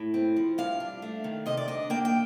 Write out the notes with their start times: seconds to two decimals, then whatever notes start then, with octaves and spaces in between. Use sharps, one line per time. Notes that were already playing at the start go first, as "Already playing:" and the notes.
Already playing: A2
0.14 C4
0.36 F3
0.58 G2 F5
0.80 D4
1.02 A3
1.24 D#3
1.46 C3 D#5
1.57 D5
1.68 D4 D#5
1.90 A#3 G5
2.05 G5